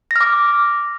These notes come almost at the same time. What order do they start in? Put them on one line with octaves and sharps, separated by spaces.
A#6 F6 D6